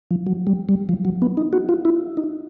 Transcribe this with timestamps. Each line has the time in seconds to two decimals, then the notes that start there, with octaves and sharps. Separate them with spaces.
0.11 F3
0.27 F#3
0.47 G3
0.69 G3
0.89 F3
1.05 F#3
1.22 B3
1.37 D#4
1.53 F#4
1.69 F4
1.85 E4
2.17 D#4